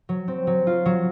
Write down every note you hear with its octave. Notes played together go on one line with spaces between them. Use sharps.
F#3
C4
F#3
F4
F#3